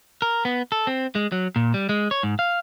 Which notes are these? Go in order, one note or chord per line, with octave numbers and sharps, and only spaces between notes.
A#4
B3
A4
C4
G#3
F#3
A#2
G3
G#3
C#5
G#2
F5